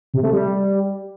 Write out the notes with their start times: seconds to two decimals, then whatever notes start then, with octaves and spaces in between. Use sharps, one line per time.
0.14 C3
0.23 A3
0.33 G3